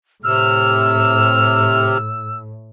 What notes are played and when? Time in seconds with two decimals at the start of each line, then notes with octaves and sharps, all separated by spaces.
0.24 A2 C3 E6 F6